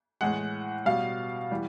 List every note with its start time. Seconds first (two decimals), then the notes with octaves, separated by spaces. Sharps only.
0.21 A2 E3 G#3 F#5
0.85 B2 G3 F5
1.51 E3 G3